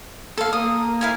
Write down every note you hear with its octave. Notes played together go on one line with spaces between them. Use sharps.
A4 F5
A#3 D#6
E4 F5 G#5